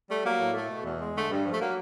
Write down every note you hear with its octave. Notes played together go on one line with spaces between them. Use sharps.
G3 A3
F#3 A#3
A2
A3
B2
E2
G#3
D3 A3
G2
F3
A3
F#3 A#3